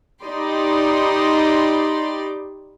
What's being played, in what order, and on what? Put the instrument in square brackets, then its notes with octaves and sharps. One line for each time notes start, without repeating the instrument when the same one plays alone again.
[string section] D#4 G4 D5 B5 C6 D6